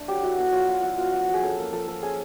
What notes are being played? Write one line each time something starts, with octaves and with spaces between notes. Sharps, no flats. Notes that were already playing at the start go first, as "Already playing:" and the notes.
Already playing: A3 D4
F#3 G4
E4 F#4
B3
F#3 F4
F#3 F4
E4 F#4
B3 F4
F3 F#4
F3
G#4
C#4 A4
A#3 A4
F3 A4
F3 A4
C#4 G#4